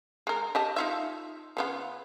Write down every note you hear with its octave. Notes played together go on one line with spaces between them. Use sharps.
G#3 A#4
G4 D#5 A5
D#4 F4 E5
C#3 B3 F4